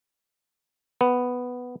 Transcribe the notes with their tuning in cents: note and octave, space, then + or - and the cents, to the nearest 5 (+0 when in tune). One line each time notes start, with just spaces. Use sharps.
B3 +5